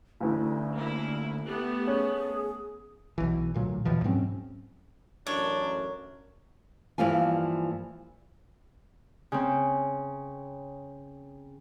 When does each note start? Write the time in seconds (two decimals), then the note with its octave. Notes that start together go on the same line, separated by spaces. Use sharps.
0.20 A1 D2 A2 D3
0.73 A#3 E4
1.45 A3 B3 G4
1.88 C#4 G#4
3.18 B1 E3
3.54 D2 A#2 F#3
3.85 D#2 B2 E3 F3
4.04 G#2 F#3 C4 C#4
5.27 A1 F#2 D4 A#4 C#5
6.98 G2 E3 F3 G3 A#3 G#5
9.32 C#3 C4